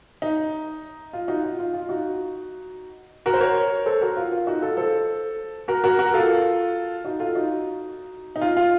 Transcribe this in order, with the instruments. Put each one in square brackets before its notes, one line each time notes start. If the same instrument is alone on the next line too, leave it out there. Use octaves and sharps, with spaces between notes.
[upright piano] D#4
F4
D#4 F#4
F4
F4
F4
D#4 F#4
F#4 A#4
C5
A#4 C#5
A4 C5
F#4 A#4
F4
F4
D#4 F#4
F4 A4
A4 C5
F#4 A#4
F#4 A#4
F#4 A#4
F4 A4
D#4 F#4
F4 A4
D#4 F#4
D#4
F4
F4